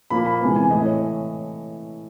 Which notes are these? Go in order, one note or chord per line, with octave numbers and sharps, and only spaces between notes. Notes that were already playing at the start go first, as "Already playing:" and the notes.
A#2 F3 A#3 B5
B5
C3 E3 G#3 B3
G#5
A2 E3 A3 D#5
C#5